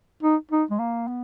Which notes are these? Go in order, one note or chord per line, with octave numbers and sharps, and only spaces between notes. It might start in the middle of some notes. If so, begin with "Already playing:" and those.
D#4
D#4
G#3
A#3
B3